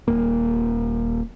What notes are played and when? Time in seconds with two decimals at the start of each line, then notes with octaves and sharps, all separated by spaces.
0.08 D#1 A#3